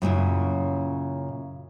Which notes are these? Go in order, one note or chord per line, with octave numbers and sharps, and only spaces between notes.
F#2 A#2 C#3 E4